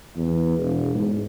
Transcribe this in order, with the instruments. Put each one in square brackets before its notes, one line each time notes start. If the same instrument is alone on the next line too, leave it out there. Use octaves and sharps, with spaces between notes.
[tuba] E2
E1
G#2